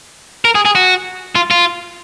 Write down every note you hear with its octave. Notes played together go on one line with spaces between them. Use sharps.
A#4
G#4
G#4
F#4
F4
F4